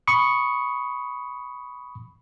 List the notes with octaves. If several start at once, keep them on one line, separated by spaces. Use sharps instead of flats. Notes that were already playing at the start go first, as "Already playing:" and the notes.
B5 C#6 D#6 C#7